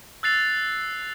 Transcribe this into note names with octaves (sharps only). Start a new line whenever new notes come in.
E6 F#6 A6 C7 F7